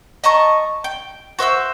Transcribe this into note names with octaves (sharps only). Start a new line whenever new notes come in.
D#5 A5 A#5 C#6
G5
F#4 C5 E5 E6